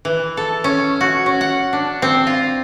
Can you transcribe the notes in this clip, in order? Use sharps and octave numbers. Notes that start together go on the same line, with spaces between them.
E3
A4
C#4
F#4
C#4
F#5
D4
C4
F4